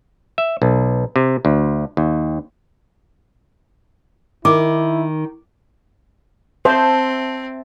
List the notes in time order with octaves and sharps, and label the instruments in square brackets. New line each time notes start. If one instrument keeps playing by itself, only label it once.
[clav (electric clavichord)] E5
B1
C3
D2
D#2
[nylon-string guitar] D#3 [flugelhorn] E4 [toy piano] D6
[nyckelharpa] C4 [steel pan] C5 [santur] E5 A5